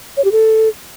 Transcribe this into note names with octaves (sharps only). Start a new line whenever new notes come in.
C#5
G4
A4